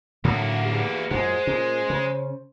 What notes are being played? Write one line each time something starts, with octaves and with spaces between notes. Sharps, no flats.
A2 D3 F#3 A#3 F#4
E2 G4
F#2 A#2 G#3 C5 F#5
A#2 C#4
C#3